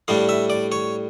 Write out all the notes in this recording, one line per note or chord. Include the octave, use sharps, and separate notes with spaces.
A2 G3 D4 F5
E5
D5
C#5